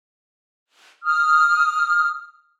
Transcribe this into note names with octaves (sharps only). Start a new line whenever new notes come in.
D#6 F6